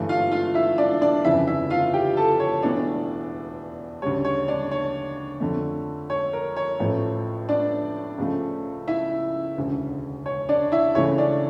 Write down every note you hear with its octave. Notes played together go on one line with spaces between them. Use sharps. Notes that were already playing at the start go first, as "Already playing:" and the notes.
Already playing: G1 G2 E3 A3
F4 F5
F4 F5
E4 E5
D4 D5
D4 D5
G1 F2 C#3 E3 E4 E5
E4 E5
F4 F5
G4 G5
A4 A5
C#5
E1 E2 E3 A3 D4 D5
D2 C#3 G3 C#5
C#5
D4 D5
C#5
F2 D3 A3
C#5
A#4
C#5
A1 A2 F3 A3
D4 D5
C#2 C#3 F3 A3
E4 E5
E1 D2 C#3
C#5
D4 D5
E4 E5
C#2 C#3 E3 A3 C#5
D4 D5